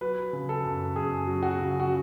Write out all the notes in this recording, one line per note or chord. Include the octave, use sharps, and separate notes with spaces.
F#3 B4
C#3
A4
F#2
F#2 G#4
F#3
F#4
C#3
F#4